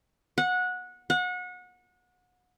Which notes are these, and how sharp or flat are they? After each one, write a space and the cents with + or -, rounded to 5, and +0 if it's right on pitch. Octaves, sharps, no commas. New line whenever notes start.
F#5 -20
F#5 -30